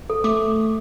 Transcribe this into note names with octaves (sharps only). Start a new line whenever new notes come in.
A4
A3 D6